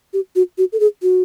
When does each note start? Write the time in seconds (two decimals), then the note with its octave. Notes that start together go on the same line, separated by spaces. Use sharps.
0.13 G4
0.36 F#4
0.58 F#4
0.73 A4
0.80 G#4
1.03 F#4